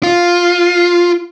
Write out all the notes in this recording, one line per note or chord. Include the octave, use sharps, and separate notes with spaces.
F4